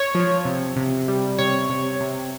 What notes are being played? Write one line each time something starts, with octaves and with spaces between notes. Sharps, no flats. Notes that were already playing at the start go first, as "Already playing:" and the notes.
Already playing: C#5
F3
C3
C3
G3
C3 C#5
C3
C3